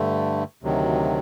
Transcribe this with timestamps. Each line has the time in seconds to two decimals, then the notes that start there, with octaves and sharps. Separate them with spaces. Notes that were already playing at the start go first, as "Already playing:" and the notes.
Already playing: G2 D3 A3
0.63 D2 C3 D#3 F#3